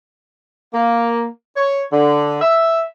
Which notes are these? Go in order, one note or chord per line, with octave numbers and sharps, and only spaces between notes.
A#3
C#5
D3
E5